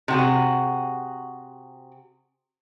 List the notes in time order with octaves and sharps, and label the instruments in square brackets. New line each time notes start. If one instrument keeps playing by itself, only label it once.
[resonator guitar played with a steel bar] C3 F#4 G#4